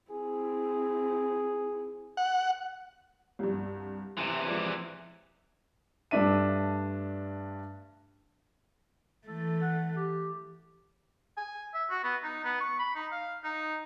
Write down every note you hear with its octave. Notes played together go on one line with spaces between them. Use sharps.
C4 E4 G#4
F#5
C2 G2
C3 E3 E4 E5
F3 G#3 D5
G2 A3 D4 E5 D#7
E3 A3 A4
F#5
G4
G#5
E5
F#4
B3
D#4
B3
C#6
B5
D#4
F5
D#4